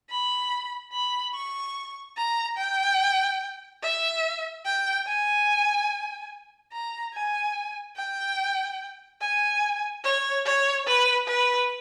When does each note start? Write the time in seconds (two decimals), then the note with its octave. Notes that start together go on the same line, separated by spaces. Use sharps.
0.10 B5
0.93 B5
1.35 C#6
2.17 A#5
2.58 G5
3.83 E5
4.65 G5
5.08 G#5
6.72 A#5
7.14 G#5
7.97 G5
9.21 G#5
10.04 C#5
10.46 C#5
10.87 B4
11.28 B4